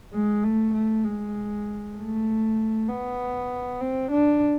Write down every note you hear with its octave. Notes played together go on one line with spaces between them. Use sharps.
G#3
A3
A3
G#3
A3
B3
C4
D4